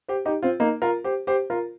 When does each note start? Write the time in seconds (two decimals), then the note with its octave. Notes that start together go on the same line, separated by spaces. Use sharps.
0.08 G4 C5
0.25 D#4 G4
0.42 C4 F4
0.60 A#3 D#4
0.82 F4 A#4
1.04 G4 C5
1.27 G4 C5
1.50 F4 A#4